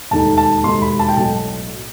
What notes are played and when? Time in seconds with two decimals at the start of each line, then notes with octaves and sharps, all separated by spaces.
0.11 E1 D#2 D#3 A3 D#4 A5
0.38 A5
0.64 E1 D#2 D#3 A3 D#4 C6
0.82 B5
0.99 A5
1.09 G5
1.17 B1 A2 F#3 A5